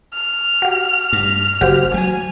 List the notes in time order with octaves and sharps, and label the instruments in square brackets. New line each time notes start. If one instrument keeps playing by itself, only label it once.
[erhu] F6
[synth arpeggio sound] F#4 G4
[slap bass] G2
[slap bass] F#1 [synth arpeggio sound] F#4 G4 C5
[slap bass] F#3 G3 [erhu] G#5